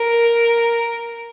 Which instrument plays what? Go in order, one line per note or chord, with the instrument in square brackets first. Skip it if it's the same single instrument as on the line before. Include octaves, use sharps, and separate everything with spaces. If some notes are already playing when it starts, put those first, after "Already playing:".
Already playing: [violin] A#4